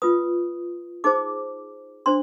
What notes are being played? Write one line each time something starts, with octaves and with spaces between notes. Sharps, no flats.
F4 B4 D#6
D#4 G#4 C5 D6
D4 C5 C6